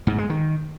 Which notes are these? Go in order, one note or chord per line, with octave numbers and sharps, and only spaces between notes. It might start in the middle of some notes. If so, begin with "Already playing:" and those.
G#2
G#3
D#3